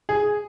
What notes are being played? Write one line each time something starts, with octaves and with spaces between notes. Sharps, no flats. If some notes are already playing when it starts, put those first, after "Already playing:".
G#4